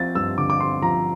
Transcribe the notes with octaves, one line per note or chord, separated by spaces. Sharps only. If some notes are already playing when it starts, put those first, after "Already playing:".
Already playing: F3 C4 A6
G2 E6
D3 D6
D6
C4 C6
F3 A#5